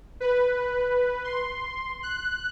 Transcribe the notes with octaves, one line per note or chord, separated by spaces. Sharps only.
B4
C6
F#6